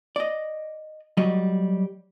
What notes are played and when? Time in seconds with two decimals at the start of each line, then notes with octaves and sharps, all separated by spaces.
0.16 D5 D#5
1.17 F#3 G3 A3 D#5